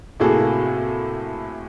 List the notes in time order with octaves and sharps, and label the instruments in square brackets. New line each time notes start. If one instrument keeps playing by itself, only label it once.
[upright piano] A2 C3 A#3 F#4 G#4 A4